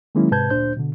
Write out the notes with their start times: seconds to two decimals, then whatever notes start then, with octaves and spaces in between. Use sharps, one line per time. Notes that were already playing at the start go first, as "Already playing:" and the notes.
0.15 D#3 F#3 G#3 A#3 C#4 E4
0.31 G#2 C3 B4 A5 G6 G#6
0.51 D2 A#2 D4 C5 G6
0.77 B2 D3